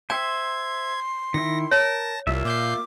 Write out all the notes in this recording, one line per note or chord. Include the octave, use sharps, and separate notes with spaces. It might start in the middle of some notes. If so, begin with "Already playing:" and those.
C5 E5 G5 C6 G#6
D#3 E4 A#6
A#4 C#5 A5 A#6
C2 A#3 F4 E5
A#2 D6 G6 C7